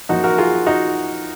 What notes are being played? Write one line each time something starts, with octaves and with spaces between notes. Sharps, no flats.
F#2 F3 A#3 D#4 F#4
F#4 A#4
F4 G#4
D#4 F#4